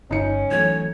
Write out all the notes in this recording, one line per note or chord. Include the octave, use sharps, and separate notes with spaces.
G1 C#4 D#4 C#7
E3 F#3 A3 C#5